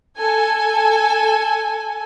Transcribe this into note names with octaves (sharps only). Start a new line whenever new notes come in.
A4 G#5